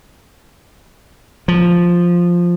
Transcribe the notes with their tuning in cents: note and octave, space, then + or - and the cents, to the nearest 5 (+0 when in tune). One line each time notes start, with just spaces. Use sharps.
F3 +0